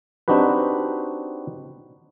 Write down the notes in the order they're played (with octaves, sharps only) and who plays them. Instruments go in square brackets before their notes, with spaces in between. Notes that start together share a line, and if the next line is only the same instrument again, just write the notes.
[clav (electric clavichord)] C4 D4 D#4 F#4 G4 B4